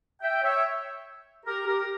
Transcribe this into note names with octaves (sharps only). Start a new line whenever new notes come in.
E5 G5
C#5 E5
G4 A#4
G4 A#4